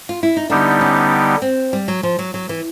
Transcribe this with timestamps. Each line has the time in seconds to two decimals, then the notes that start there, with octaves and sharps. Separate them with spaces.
0.09 F4
0.23 E4
0.37 D#4
0.50 D3 G3 B3 D4 D#4 G4
0.81 C#4
1.42 C4
1.73 G3
1.88 F#3
2.03 F3
2.19 F#3
2.34 F#3
2.49 E3